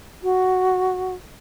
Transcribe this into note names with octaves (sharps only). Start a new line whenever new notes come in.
F#4